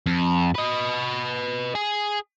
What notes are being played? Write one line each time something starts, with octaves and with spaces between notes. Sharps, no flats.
F2
B4 D#5
G#4